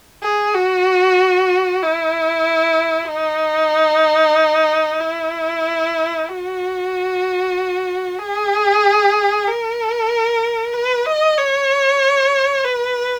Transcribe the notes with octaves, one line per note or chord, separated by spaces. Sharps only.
G#4
F#4
E4
D#4
E4
F#4
G#4
A#4
B4
D#5
C#5
B4